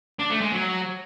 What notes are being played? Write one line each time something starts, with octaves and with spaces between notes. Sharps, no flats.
D4
A3
G#3
F#3